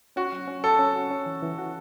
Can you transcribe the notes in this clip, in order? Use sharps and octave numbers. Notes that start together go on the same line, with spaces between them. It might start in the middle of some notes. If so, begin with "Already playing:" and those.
C#4 F#4
F#3
C#4
F#4 A4
C#4
F#4
C#4
E3
E3
F#4